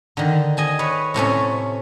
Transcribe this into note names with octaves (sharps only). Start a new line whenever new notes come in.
D3 D#3
D#5 G#5 A5
B4 C#5
A2 C3 A3 C#4